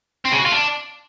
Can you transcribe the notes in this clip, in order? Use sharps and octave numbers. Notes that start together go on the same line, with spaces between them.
C4
C#3
F#4
F4
D4